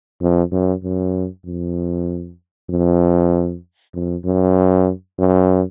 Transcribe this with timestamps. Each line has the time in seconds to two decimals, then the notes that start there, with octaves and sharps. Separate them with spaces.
0.21 F2
0.52 F#2
0.84 F#2
1.46 F2
2.70 F2
3.94 F2
4.25 F#2
5.18 F#2